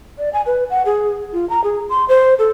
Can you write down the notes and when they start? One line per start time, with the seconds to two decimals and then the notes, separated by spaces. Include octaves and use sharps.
0.18 D5
0.33 G#5
0.46 B4
0.70 F#5
0.85 G#4
1.33 F4
1.49 A#5
1.64 G#4
1.89 C6
2.08 C5
2.39 A4